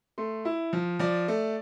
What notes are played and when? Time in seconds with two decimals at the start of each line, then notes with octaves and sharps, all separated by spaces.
0.18 A3 C6
0.45 E4
0.73 F3
0.99 F3 D5
1.28 A3